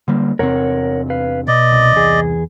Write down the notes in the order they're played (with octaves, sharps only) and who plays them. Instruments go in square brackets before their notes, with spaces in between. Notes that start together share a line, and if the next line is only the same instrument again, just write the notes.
[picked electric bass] D3 G3 A#3
[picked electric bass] E2 C3 C4 [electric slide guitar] A#4 C#5 F#5
[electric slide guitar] B4 F5
[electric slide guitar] B2 [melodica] D5 D#5
[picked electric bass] C2
[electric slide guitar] E2 G#4